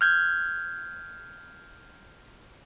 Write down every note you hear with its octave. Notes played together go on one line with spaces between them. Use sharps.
F6 G6 G#6